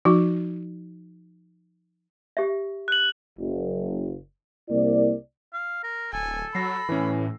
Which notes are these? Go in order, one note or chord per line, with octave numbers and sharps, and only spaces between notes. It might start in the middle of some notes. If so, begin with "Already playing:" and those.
F3 D#4 F#4
G4 E5
F#6 F#7
F#1
C2 A#3 E4 D5
F5
A#4
D1 A4 G#5
F#3 B5 E6 A#6 C7
A2 E3 C#4